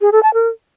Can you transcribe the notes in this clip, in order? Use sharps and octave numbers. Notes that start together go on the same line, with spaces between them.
G#4
A4
A5
A#4